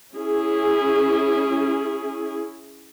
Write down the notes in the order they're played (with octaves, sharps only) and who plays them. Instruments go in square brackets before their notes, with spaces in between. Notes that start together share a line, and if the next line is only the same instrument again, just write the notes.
[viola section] C#4 E4 G#4